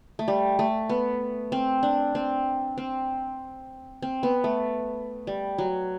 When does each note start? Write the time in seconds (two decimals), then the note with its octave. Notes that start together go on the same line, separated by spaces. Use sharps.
0.19 A3
0.28 G3
0.59 A3
0.89 B3
1.52 C4
1.83 D4
2.15 C4
2.78 C4
4.02 C4
4.23 B3
4.44 A3
5.27 G3
5.58 F#3